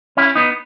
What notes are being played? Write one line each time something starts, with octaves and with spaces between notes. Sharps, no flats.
C#4 E4
B3 D#4